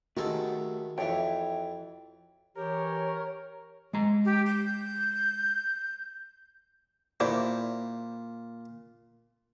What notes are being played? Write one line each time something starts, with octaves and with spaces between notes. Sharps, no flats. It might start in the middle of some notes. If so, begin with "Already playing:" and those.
D#3 G#3 A3 F#4 G4 A4 F#5
F2 E3 C#5 E5 G5
E3 G4 A#4 C#5
G#3 A#5
G4
G6
A#2 E4 C5 D5